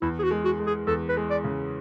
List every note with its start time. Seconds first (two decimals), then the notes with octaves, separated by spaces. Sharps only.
0.02 E2 E4
0.19 G#4
0.24 F#4
0.31 G#3
0.45 F#4
0.59 G#3
0.67 G#4
0.87 E2 A4
1.09 B4
1.17 G#3
1.30 D5
1.44 C#3